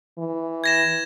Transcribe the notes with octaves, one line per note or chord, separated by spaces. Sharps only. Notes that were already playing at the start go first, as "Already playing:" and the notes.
E3
G#6 A#6 E7